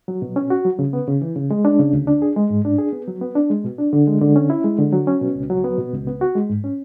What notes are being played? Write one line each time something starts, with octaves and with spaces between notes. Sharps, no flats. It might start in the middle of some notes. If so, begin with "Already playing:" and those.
F#3
B2
C#4
F#4
F#3
C#3
B3
C#3
E3
C#3
G#3
D4
C#3
D2
D4
G#4
G#3
G#2
D4
G#4
B3
F#3
B3
D4
G#3
B2
D4
D3
G#3
D3
C#4
E4
G#3
D3
F#3
C#4
B2
C#2
F#3
B3
B2
C#2
B3
F#4
G#3
G#2
C#4